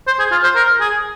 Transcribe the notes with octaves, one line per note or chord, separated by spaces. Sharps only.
C5
G#4
F4
C5
A#4
G#4